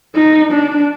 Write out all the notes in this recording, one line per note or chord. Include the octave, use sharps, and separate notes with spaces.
D#4
D4